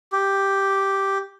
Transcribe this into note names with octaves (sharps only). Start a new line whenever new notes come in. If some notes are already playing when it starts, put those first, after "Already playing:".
G4